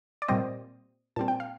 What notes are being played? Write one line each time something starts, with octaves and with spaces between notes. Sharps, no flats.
D5
A#2 G3 C4 C5 D#5
A#2 G3 C4 A5
G5
F5